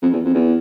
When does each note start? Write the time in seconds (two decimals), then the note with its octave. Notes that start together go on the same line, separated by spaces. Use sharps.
0.02 F2
0.13 E2
0.25 F2
0.35 E2